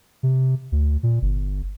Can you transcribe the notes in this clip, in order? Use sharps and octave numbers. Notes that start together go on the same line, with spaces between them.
C3
D2
A#2
G1